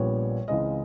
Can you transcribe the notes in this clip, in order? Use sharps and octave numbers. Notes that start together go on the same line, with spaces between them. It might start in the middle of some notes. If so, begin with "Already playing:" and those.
Already playing: A#1 A#2 G3 B3 C#5
C#2 C#3 E3 G#3 C4 D#5